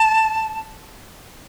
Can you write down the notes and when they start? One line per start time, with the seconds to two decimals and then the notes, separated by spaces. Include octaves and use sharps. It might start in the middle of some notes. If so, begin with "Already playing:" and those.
Already playing: A5